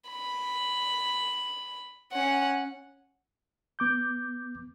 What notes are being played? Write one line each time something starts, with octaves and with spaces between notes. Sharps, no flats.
B5
C#4 F#5
B3 D6 G6